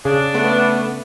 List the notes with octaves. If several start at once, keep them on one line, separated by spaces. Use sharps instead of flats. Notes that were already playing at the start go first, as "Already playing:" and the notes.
C#3 D4 G#4
A3 B3